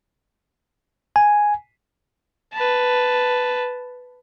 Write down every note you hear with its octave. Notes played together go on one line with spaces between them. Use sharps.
G#5
B4 A5